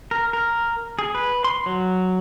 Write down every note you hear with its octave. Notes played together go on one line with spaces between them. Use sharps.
A#4
A#4
G#4
B4
C6
F#3